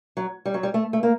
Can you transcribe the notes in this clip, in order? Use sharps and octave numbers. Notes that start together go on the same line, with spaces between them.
F#3
G3
F#3
G3
A3
A3
A#3